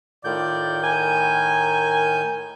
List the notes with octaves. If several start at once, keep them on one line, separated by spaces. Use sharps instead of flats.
A2 D#3 F4 A4 D5 G6
A#4 G#5